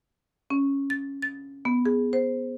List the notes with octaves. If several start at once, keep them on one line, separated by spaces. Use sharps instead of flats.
C#4
A6
A6
B3
G#4
C5